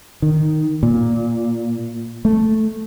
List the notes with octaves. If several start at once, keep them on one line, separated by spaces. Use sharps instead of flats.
D#3
A#2
A3